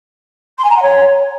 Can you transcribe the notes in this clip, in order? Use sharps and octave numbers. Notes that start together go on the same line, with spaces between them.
C6
G#5
A#5
F#5
C#5